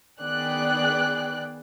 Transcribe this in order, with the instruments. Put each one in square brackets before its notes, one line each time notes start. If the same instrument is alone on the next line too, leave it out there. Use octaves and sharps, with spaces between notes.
[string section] D#3 B3 G#4 D5 G5 F#6